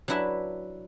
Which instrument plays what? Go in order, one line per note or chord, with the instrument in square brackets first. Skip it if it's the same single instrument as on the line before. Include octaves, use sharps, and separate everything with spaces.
[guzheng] F#3 D4 E4 B4 E5